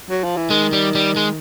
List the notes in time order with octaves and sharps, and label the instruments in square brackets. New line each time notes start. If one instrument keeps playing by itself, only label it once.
[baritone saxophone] F#3
F3
E3
[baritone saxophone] D#3 [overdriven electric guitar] G#3
[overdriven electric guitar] G3
G3
G#3